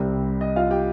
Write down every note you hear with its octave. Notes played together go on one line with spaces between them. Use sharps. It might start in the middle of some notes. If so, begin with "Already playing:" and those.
Already playing: C2 C3 G3 C4
D#5
F4 F5
G4 G5